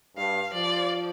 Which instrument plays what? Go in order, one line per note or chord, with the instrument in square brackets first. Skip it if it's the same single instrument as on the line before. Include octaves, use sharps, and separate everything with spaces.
[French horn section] G2 [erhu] F5
[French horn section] F3 [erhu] D5